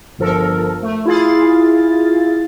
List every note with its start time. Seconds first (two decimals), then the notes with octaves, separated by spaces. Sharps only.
0.18 G1 G2 F3 A4 A#4
0.83 A3
1.05 E4 F4 G#4 F5 A6